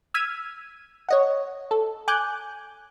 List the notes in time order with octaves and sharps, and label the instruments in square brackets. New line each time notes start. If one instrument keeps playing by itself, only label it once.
[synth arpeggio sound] E6 F6 G#6 B6 D#7
C#5 D#5 F#5
A4
G#5 D6 F#6 G6